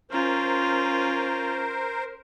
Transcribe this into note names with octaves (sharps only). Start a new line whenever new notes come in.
C#4 F4 A#4 C5